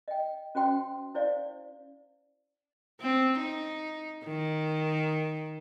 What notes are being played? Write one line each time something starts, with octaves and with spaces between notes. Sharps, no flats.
D#5 G5
C#4 F#4 C5 G5 C6
E4 C5 D5 F5
C4
D#4
D#3